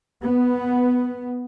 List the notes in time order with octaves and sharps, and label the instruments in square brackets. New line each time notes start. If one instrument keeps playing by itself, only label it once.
[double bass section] B3